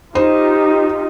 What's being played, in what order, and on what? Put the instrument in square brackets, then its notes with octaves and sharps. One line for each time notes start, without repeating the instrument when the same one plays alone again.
[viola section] D#4 F4 G4 [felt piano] C5